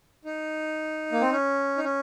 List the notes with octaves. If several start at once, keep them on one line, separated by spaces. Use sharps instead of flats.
D#4
A#3
C4
C#4
D#4
C#4